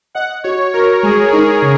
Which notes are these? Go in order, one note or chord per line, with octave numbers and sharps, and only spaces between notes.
D#5 F#5
F#4 C#5
F#4 A#4
G#3 G#4
D#4 G#4
C#3